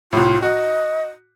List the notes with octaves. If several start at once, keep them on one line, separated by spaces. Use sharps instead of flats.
C2 A2 F4
F#4 D#5